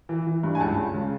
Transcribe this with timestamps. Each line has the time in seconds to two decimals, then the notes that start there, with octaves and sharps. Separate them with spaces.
0.09 E3
0.27 E3
0.43 G2
0.55 G#5
0.60 C#2 A5
0.77 C#2
0.94 C#3